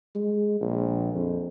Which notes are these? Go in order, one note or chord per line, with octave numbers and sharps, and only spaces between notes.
G#3
A#1
F2